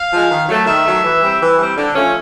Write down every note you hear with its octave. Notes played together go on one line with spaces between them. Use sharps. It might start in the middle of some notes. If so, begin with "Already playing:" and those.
Already playing: F5
F3 G#3
D#3
F#3 A3
D#3 E5
F#3 A3
E3
G3 C4
E3
G3 C4
D3
F3 A3 C#4